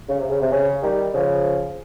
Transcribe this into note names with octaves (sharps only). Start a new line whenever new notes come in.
C#3
C3
C#3
C3
C#3
D#3 G3
C#3 F3